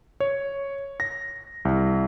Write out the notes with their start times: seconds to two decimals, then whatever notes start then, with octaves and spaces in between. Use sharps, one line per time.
0.20 C#5
1.00 A#6
1.65 C2